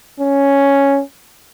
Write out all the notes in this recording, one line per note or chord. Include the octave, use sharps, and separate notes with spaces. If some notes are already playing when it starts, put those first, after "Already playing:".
C#4